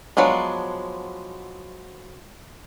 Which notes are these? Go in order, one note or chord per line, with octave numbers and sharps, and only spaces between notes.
F3 F#3 G#3 B3 D4